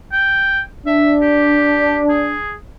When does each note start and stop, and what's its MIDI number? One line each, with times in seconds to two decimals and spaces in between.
0.12 0.60 79
0.86 2.36 62
0.86 1.13 76
1.21 2.01 67
2.09 2.52 68